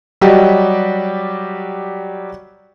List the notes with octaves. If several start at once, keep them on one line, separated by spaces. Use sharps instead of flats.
F#3 G3 G4 D5 D#5 F#5